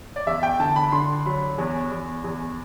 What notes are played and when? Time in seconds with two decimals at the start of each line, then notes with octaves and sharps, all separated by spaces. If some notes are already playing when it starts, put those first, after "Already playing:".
0.16 D5
0.27 E2 E5
0.43 G5
0.60 D3 A5
0.76 B5
0.92 D3 C6
1.26 F#3 B5
1.58 E2
1.91 E2
2.24 E2